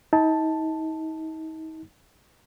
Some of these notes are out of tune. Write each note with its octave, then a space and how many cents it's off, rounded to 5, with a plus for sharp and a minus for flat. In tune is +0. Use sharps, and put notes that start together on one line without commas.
D#4 +40 A5 +0